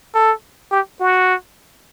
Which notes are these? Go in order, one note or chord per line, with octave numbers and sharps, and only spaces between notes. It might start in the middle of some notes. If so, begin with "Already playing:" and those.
A4
G4
F#4